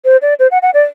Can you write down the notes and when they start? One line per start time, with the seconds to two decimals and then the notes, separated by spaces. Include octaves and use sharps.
0.05 C5
0.22 D5
0.39 C5
0.51 F#5
0.62 F#5
0.74 D5